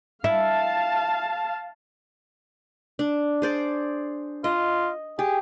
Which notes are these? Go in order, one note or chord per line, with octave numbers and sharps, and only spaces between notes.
E4 F5 A5
D4
G#4 C5 D5
F4 D#5
G4 G#4